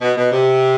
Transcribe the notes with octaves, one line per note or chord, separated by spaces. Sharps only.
B2
B2
C3